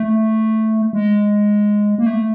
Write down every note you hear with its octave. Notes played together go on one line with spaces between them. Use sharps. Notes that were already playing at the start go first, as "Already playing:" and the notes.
Already playing: A3
G#3
A#3
A3